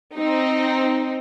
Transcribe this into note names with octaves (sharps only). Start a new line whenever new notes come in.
C4 D#4